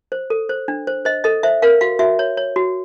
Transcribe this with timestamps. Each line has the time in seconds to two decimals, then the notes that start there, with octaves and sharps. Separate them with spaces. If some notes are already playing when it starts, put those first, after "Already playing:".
0.12 C5
0.30 A4
0.49 C5
0.68 D4
0.87 C5
1.05 C5 D#5
1.24 A4 D#5
1.43 C5 E5
1.62 A#4 F5
1.81 F#4 F5
1.99 F#4 E5
2.19 C#5
2.37 C#5
2.56 F#4